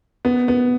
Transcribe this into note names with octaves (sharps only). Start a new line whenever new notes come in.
B3
B3